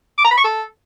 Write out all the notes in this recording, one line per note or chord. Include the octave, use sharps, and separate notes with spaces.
D6
A#5
B5
C#6
A4